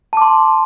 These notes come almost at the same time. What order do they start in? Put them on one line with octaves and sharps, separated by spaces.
A5 D6 C6